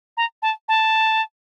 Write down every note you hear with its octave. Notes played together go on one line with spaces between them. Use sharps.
A#5
A5
A5